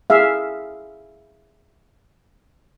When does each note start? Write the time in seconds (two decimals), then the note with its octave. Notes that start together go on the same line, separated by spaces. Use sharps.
0.10 G#4 E5 F5